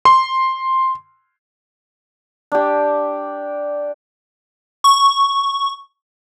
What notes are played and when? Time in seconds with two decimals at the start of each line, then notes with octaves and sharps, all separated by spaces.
0.05 C6
2.52 D4 G4
4.84 C#6